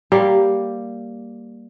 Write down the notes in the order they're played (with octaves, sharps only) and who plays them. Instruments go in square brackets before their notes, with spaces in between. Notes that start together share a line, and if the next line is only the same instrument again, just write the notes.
[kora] G3 A#3 G4